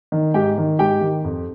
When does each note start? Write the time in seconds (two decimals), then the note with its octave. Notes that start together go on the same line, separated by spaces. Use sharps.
0.12 D#3
0.34 G#2 G4 G5
0.58 D#3
0.79 G#2 G4 G5
1.01 D#3
1.24 F2